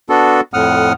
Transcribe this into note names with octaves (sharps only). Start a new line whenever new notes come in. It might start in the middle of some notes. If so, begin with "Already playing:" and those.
B3 D4 F#4 A4
F2 A2 F#5 D#6 F6